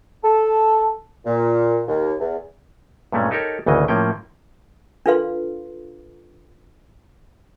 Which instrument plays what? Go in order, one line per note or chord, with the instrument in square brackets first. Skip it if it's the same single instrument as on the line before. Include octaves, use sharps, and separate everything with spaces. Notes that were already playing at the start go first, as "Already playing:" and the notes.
[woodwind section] A4
A#2
D#2
E2
[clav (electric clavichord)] G2 A#2 G#3 A3 C#4
D#4 G4 A4 A#4 C#5
G#1 D2 C#3 E3 D#5
A2 F3 A#3 C#4 G5
[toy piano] D4 F4 A4 B4 F5 C6